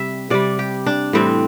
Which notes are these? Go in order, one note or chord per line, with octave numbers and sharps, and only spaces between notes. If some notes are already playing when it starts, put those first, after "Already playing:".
Already playing: C3 G3 E5
C3 G3 D5
G4
D4
A2 E3 G3 C4